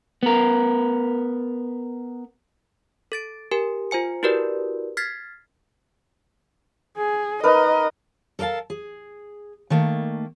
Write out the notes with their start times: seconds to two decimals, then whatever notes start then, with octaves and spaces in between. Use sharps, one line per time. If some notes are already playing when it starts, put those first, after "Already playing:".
0.23 B3 A#4
3.12 A4 A6 D7
3.51 G4 A#4 G#5
3.91 F4 C5 G#5 C#7
4.23 E4 F#4 G4 A#4 B4 D5
4.97 F6 G#6 A6 B6 C7
6.98 G#4
7.43 D#4 A#4 B4 D#5
8.39 A4 A#4 D#5 F5 A5
8.70 G#4
9.70 D#3 A3 A#3